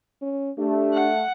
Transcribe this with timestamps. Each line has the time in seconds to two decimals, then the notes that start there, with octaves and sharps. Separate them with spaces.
0.22 C#4
0.59 A3 D4 G4
0.94 F#5